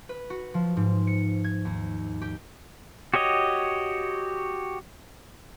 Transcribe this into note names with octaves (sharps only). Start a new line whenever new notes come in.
B4
F#4
F3
G#2
C#7
G#6
D#2
G4
F#4 G4 C#5 D#5